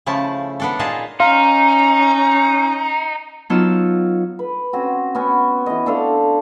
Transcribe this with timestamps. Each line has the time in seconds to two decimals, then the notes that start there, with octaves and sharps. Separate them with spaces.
0.06 C#3 F3 A3 E4 A5
0.60 B3 D4 A4
0.79 A#2 D#4 F4 G#4 E5 A5
1.20 C#4 D#4 F5 A#5 C6
3.50 F#3 B3 D#4 F4 A5 E6
4.39 B4
4.73 C4 C#4 F#4
5.15 B3 C#4
5.66 E3 D#5
5.86 D4 A4 C5 F5